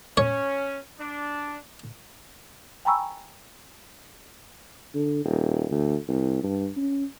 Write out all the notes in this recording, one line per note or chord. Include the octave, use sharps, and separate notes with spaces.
C#4 C#5
D4
G5 G#5 A#5 B5 C#6 E6
D3
D#1
D2
C2
G2
C#4